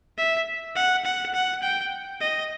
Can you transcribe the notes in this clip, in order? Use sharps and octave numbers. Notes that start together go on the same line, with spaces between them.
E5
F#5
F#5
F#5
G5
D#5